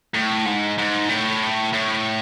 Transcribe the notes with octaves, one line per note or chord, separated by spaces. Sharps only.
A2
G#2
G#2
A2
A2